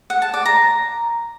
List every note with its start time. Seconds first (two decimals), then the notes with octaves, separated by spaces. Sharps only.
0.10 F#5
0.22 A5
0.34 D5
0.45 A#5